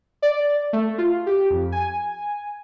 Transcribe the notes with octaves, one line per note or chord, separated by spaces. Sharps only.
D5
A3
F4
G4
F2
G#5